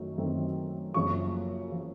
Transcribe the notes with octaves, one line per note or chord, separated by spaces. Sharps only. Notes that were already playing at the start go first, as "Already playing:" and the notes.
Already playing: F#2 D#3 F#3 A3
F#2 D#3 F#3 A3 C4
F#1 F#2 F3 C#6
F3